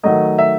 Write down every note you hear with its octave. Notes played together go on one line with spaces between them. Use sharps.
D#3 F#3 A3 D#5
E5